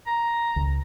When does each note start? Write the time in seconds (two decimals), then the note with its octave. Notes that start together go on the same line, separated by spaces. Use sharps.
0.07 A#5
0.56 C#2